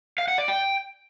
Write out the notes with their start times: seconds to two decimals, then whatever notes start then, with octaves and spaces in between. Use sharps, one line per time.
0.18 F5
0.28 F#5
0.38 D5
0.48 G5